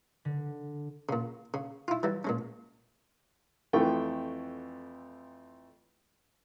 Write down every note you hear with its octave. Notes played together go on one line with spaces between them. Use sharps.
D3
A#2 C#3
C#3
E4 F4
E3 F#3 G3
A#2 G#3 C#4
F2 E3 A3 F4 G5 C#6